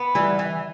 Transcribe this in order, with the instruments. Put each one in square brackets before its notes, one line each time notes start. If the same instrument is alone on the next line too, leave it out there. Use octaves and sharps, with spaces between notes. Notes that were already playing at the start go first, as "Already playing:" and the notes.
Already playing: [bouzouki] B3
[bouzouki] E3 [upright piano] G3
[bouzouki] E3